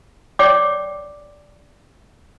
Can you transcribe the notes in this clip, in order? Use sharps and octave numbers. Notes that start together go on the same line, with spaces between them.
C#5 D5 G5 D6